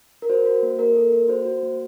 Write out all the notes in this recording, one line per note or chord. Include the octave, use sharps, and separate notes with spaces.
A#4
F#4 C5
F#4
A#3
A#3 A#4
A4
A#3
F#4 C5
F#4
A#3